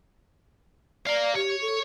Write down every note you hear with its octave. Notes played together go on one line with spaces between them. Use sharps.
D5 F5 A#5
G4 C#5
A4